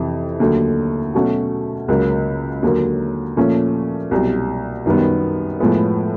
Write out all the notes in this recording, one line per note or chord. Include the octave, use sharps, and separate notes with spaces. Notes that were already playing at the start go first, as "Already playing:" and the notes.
Already playing: F2 C3 E3
D#2 D3 F#3 A3
B2 F#3 A3 C#4 F#4
C#2 C#3 F#3 A#3
D#2 D3 F#3 A#3
A#2 F3 A3 C#4
C2 B2 F#3
F#2 D#3 G3 B3
A2 F3 G#3 B3